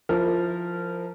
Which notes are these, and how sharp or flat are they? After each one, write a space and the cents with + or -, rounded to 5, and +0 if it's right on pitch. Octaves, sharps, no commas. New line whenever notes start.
F3 +0 E4 +0 A#4 -20